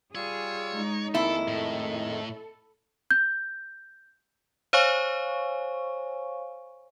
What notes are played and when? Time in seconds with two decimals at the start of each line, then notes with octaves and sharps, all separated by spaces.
0.15 G3 F4 G#4 C#5 E6
0.74 G#3 D#4
1.14 F2 D#3 G#3 A#3 E4 A4
1.48 A2 A4
3.11 G6
4.73 C5 C#5 F5 G#5 C#6